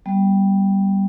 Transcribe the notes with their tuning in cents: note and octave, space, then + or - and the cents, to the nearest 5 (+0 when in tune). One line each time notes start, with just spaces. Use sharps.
G3 +0 B3 -20